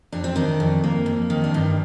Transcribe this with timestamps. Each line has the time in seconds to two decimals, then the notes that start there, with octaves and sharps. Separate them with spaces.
0.12 F2 D4
0.24 C4
0.36 D#3 D4
0.60 F2
0.84 A#3
1.06 F2
1.30 D#3
1.44 D4
1.54 G2 D#4